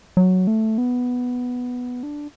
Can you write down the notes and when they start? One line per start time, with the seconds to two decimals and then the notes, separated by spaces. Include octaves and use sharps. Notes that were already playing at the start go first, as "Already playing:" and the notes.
0.17 F#3
0.47 A3
0.78 B3
2.03 D4